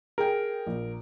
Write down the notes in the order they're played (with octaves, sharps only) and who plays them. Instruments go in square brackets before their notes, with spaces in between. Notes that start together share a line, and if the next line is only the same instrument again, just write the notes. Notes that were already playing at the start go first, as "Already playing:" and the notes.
[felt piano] G#4 G5 [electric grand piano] A#4
[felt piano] A#1